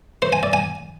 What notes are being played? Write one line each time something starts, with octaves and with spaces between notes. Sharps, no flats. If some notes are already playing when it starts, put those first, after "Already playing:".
C5
G#5
D5
G#5